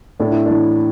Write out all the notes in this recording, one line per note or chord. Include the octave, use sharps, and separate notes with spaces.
A2 D4
E4
D4
E3